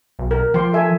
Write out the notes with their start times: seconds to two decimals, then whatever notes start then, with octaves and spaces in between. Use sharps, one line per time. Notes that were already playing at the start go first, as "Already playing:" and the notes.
0.19 B1
0.31 A#4
0.54 F3 G5 C6 D6
0.73 A4 E5 G#5